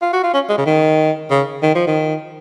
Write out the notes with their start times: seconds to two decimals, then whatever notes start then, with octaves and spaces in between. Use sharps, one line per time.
0.02 F4
0.13 F#4
0.23 F4
0.34 C#4
0.49 G#3
0.58 C#3
0.66 D#3
1.30 C#3
1.62 D#3
1.75 F3
1.87 D#3